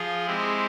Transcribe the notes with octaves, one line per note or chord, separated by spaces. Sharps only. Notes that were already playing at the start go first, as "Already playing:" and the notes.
Already playing: F3 F4 G#4
G#3 C4 E4 G4